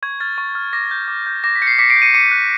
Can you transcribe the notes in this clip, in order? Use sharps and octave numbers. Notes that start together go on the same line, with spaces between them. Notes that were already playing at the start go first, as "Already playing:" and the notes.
C#6 G#6
F6 A6
C#6
F6
D6 A#6
G6
D6
G6
D6 A#6
B6
G6 C#7
C7
D6 B6 C#7
C7 D7
G6
C#7 D#7
D6 C#7 D#7
F#6